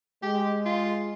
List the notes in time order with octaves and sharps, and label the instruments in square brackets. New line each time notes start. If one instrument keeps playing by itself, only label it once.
[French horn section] G#3 [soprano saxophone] G4
[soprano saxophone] F4